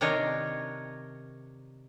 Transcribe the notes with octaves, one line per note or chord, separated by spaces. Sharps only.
C3 D#3 D4 A#4 C#5 D#5